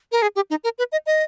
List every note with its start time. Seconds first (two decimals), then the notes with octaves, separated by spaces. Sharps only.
0.12 A#4
0.22 G#4
0.36 G4
0.50 D#4
0.64 A#4
0.78 B4
0.92 D#5
1.06 D#5